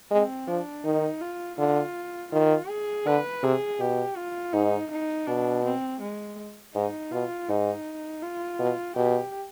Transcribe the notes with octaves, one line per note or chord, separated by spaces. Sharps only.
G#3 C4
F3 D4
D#3 D#4
F4
D3 F4
D#3 F4
G#4
D3 B4
C3 G#4
B2 G4
F4
G#2 D#4
D#4
B2 D4
C4
G#3
G#2 D#4
B2 F4
G#2 D#4
F4
B2
B2 G4